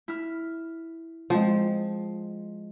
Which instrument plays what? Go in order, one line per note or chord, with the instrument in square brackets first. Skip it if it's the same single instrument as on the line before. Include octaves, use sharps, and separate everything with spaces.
[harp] E4 F6
[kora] F3 [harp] G#3 C4